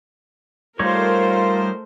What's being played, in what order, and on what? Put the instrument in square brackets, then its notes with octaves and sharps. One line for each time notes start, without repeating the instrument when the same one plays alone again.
[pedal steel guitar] G3 D#4 C#5 [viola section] A3 A#4 C5 [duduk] F4